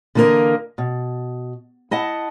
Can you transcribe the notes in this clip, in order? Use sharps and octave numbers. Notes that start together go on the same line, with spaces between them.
D3 E3 A#3 B3 A#4 D#5
B2
E4 D#5 F#5 A5